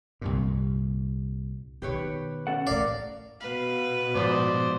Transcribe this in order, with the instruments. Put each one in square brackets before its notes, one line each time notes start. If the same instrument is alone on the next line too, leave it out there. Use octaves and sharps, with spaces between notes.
[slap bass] C2 G2 A#2
[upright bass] B2 D#3 [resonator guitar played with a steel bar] G4 B4 C#5
[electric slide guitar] C#4 A4 F#5
[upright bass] A2 E3 [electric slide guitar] A#4 F5 [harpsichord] D5
[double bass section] B2 [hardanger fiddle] B4 [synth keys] F5
[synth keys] G#2 F3 [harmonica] C5 D5 D#6